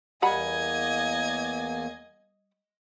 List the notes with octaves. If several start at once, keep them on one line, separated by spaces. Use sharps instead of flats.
E2 G3 A#3 D#5 F#5 G#5 B5 G#6